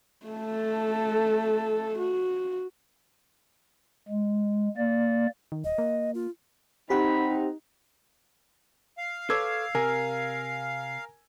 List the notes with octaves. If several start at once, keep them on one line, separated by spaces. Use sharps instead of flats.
A3 A4
F#4
G#3
A#3 D5
D#3
D#1 D#5
A#3
F4
C4 D#4 G4 F#5 B5
F5
A4 B4 C#5 D6 E6 G#6
C3 A#4 G#5